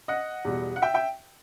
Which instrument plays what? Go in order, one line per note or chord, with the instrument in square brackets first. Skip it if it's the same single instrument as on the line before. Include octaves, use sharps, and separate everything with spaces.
[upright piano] D#5 F#5
E2 B2 G3
F#5
E5 G5
E5 G5